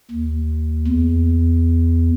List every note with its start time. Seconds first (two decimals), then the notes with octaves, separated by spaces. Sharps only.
0.11 D#2
0.87 E2